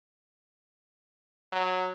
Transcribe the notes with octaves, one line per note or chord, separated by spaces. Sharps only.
F#3